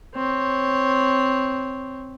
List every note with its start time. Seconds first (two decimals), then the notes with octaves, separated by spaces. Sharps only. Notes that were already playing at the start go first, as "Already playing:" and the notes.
0.15 C4 C#5